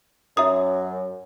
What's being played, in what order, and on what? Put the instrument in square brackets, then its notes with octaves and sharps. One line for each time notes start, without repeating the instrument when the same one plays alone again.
[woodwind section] F#2 [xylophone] E5 A#5 D#6